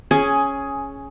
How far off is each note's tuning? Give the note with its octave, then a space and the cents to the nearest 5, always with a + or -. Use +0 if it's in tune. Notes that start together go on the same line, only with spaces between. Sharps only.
C#4 +0 G#4 +10